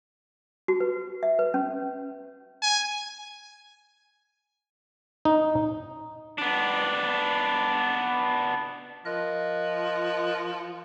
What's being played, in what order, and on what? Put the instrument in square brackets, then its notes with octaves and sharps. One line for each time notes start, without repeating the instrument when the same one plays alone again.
[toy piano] F#4
B4
E5
B4
C#4
[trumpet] G#5
[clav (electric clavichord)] D#4
[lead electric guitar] B3 D4
[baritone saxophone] F3 [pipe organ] A#4 D#5 F#6